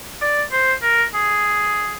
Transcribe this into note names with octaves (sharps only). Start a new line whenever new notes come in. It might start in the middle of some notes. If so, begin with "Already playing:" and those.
D5
C5
A#4
G#4